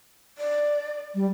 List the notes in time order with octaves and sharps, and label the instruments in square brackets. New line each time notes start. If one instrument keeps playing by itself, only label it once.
[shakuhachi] D5
[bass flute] G3